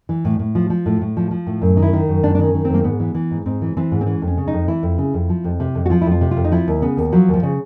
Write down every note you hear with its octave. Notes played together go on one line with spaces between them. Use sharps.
E3
A2
A2
F3
F3
A2
A2
F3
F3
A2
F#2
D#3
E4
D#3
F#2
F#2 D4
D4
D#3 C#4
D#3
F#2 C4
A#3
G#2 B3
E3
E3
G#2
G#2 C4
E3
E3 C4
G#2
C4
E3 C#4
F2
C#4
C#3
D#4
F2
E3 E4
F2
C#3
F2
F3
F2
C3
F2
F#4
F3 F4
E4
F2
F4
C3
F4
F2
D#4
F3 E4
D#2
C#3 B3
D#2
F3 F#3
D#2
F3
C#3